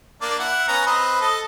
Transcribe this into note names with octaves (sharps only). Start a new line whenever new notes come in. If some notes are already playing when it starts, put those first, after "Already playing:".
A#3 D4 D5
E4 F#5
B3 C#4 A#5
C4 B4 D#5
A4 D#5